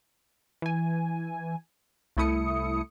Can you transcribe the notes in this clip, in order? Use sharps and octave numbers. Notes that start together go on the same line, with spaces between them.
E3 G#5
C2 A3 E4 D#6 C#7